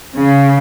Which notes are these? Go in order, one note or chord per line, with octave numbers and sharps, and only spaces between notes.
C#3